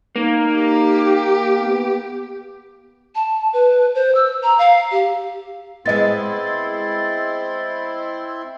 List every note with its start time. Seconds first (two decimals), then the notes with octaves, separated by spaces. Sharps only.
0.16 A#3 D#4
0.56 G4
1.58 B3
3.15 A5
3.53 B4
3.95 C5
4.15 E6
4.43 A#5
4.58 F5
4.91 G4
5.85 G#3 B3 C4 E4 D#5 C6 A6